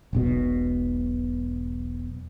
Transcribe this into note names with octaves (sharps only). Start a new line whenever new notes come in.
E1 B1 B2